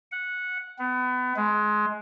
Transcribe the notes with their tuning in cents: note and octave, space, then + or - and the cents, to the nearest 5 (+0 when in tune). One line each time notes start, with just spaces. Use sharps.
F#5 -10
B3 +30
G#3 +20